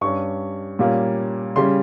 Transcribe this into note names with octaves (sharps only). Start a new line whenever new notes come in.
G2 G3 C#4 C#6
A#2 G3 A#3 C#4
C#3 G3 C#4 C6